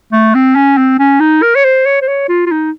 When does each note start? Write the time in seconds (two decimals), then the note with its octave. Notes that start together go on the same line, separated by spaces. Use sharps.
0.12 A3
0.35 C4
0.55 C#4
0.77 C4
0.99 C#4
1.20 D#4
1.42 A#4
1.55 C#5
1.64 C5
1.86 C#5
2.02 C5
2.08 C#5
2.28 F4
2.46 F4
2.51 D#4